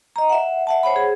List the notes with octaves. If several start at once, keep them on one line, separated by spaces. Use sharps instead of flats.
D#5 A#5
E5 F#5
E5 F#5 A5
C5 C#5 F#5 B5
G#4